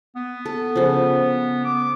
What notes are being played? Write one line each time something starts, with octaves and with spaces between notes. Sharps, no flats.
B3
A4
C#3 F3
D6